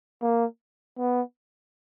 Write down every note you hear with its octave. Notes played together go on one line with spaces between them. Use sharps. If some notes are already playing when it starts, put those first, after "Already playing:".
A#3
B3